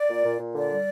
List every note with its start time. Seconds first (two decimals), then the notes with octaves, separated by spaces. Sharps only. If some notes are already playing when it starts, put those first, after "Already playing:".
Already playing: D5
0.08 A#2
0.24 A#2
0.39 A#2
0.54 D3 D5
0.69 G3